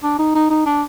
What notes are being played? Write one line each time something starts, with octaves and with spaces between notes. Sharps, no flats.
D4
D#4
D#4
D#4
D4